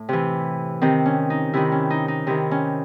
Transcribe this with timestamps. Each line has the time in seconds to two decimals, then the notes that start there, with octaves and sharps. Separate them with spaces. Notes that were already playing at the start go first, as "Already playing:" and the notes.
Already playing: A2
0.09 C3 E3
0.81 C3 D#3 C4
1.06 C#4
1.30 D#4
1.53 C3 D#3 E4
1.72 C#4
1.90 D#4
2.08 D#4
2.27 C3 D#3 E4
2.51 C#4